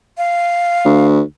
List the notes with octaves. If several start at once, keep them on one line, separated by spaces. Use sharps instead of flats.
F5
D2